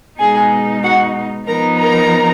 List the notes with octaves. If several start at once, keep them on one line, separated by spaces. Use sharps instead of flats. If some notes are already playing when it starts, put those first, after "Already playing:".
B2 G#3 D#4 G#4 G#5
F#4 F#5
F3 B3 D#4 A#4 A#5
A#4 A#5